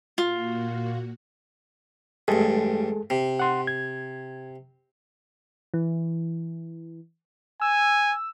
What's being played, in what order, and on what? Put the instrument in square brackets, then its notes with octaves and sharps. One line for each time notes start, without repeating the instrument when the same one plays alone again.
[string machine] A#2 A#3 F#4 [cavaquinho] F4
[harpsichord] A1 G2 [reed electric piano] G#3 G#4 A4
[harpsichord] C3
[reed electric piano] F#5 C6
G#6
[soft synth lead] E3
[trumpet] G#5 [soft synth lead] E6